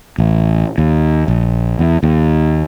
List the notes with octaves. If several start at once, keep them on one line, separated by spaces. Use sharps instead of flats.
A1
D#2
A#1
E2
D#2